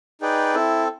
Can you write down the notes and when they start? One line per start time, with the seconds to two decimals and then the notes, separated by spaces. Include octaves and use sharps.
0.21 D#4 G#4 B4 D5 G5
0.55 C4 E4 A4